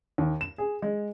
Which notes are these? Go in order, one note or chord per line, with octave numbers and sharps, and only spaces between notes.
D#2
E7
G#4
G#3